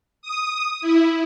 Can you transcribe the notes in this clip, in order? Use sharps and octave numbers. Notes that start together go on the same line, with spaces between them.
D#6
E4